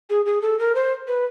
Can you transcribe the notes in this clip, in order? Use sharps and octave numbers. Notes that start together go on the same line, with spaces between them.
G#4
G#4
A4
A#4
C5
B4